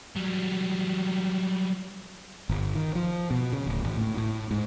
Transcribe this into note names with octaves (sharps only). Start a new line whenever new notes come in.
F#3 G3
G1
D#3
F3
B2
C#3
D1
G#1
A2
A2
G#2